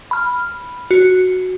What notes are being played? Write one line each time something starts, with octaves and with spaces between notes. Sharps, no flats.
B5 F6
F#4